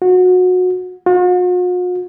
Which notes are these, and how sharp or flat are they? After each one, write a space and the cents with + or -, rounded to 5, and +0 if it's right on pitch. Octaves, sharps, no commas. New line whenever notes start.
F#4 -20
F#4 -45